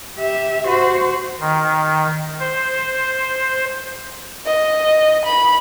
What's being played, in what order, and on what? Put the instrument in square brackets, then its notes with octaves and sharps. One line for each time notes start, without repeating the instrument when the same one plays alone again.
[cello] G4 E5
F#4 C5
[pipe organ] D#3
C5
[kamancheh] D#5
B5